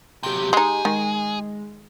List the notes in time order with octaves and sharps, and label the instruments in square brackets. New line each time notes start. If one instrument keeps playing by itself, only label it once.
[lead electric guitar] C3 F#3 [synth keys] G4 G6
[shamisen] G#3 D#4 [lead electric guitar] G#4
[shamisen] D#3 [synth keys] G#3